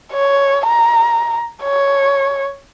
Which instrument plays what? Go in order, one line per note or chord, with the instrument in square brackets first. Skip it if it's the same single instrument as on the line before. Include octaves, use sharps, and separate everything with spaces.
[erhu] C#5
A#5
C#5